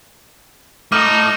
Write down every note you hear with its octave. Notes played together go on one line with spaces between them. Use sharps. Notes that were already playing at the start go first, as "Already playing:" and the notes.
A3 D#4 E4 D6 F6 D#7